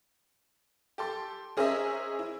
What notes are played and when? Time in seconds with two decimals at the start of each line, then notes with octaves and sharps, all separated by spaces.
0.98 G4 A4 C6
1.57 C#4 G#4 A#4 C5 D#5 E5
2.19 E4